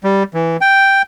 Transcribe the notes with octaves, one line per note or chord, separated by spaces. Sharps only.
G3
E3
G5